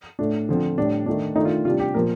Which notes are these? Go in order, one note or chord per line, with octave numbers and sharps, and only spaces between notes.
A2 A3 D4
D3 F3 C4
A2 G3 D4
D#3 A3 D4
D#3 A3 D4 D#4
F4
C3 G3 D4 F4
G4
A#2 F3 A#3 A#4